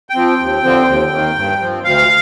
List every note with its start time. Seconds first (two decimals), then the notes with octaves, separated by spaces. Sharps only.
0.10 G5
0.15 F3 C4
0.39 D#2
0.63 D3 F3 C4
0.87 D#2
1.11 D#3 A#3
1.35 G2
1.60 F3 C4
1.84 D2 F5